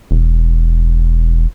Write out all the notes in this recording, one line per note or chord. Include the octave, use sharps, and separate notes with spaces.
E1